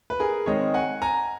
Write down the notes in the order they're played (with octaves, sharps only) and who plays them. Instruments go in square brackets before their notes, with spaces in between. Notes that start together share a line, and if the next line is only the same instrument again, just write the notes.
[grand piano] B4
G#4 A#4
D#3 G#3 C4 C#5 D#5
F#5 G#5
G#5 A#5